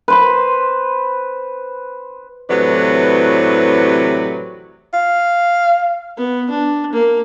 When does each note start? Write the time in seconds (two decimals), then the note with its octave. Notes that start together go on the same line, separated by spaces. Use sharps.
0.08 B4 C5 B5
2.49 A2 C3 E3 F#3 B4 D5
4.93 F5
6.17 B3
6.50 D4
6.93 A#3